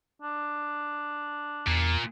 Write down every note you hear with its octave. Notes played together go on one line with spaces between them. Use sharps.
D4
E2 A#2